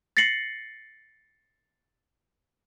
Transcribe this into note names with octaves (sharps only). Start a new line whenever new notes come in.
A6 A#6 C7 C#7 F#7